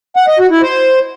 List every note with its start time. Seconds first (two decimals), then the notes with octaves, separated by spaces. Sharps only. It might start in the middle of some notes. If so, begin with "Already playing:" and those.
0.16 F#5
0.28 D#5
0.39 F#4
0.51 E4
0.62 C5